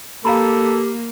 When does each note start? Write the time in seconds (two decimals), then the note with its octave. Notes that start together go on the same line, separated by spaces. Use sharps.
0.25 A#3 G4 A4 F5 A#5 B5